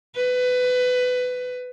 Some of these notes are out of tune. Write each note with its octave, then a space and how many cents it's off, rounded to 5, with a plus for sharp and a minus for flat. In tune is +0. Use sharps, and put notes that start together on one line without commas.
B4 +20